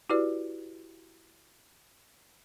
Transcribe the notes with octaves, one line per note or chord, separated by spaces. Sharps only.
E4 F#4 G4 B4 D5